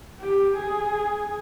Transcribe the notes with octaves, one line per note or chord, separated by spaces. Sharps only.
G4
G#4